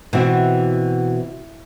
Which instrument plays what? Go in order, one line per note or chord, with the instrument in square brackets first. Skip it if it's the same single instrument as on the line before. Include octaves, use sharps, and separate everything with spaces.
[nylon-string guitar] B2 C4 F#4 [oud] E3